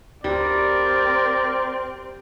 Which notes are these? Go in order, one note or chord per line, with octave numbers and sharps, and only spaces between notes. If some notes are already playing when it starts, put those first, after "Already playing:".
D2 G3 C4 A#4 D5